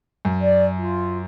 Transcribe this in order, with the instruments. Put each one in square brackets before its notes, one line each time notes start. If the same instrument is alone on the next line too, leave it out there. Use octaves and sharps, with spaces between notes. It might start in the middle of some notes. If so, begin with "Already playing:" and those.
[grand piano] F#2
[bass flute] D5
F4